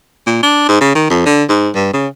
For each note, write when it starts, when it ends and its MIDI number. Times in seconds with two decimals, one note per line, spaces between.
0.26 0.42 46
0.43 0.66 62
0.68 0.80 44
0.81 0.91 49
0.95 1.08 51
1.10 1.22 41
1.26 1.43 50
1.49 1.70 44
1.75 1.91 43
1.93 2.07 49